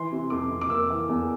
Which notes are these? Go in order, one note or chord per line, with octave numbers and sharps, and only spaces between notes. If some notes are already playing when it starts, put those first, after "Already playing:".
Already playing: E3 C6
C3
F2 D6
F2
D6
A#3 E6
E3
E2